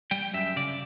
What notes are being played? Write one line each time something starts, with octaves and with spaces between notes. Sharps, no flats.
G3 G5
F#2 E5
C#3 D5